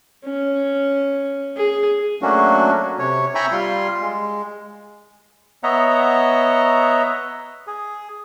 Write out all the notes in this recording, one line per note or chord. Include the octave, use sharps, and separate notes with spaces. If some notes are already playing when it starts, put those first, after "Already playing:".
C#4
G#4
F#3 A3 A#3 C#4 D4 F#4
C3 C#5
E5 G5 G#5 A#5 B5 C#6
G3 F4 C6
G#3
B3 C#5 D#5 E5 F#5 A#5
G#4